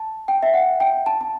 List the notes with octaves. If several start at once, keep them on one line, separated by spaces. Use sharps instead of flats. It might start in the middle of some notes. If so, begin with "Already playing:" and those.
Already playing: A5
G5
E5
F#5
G5
A5
A5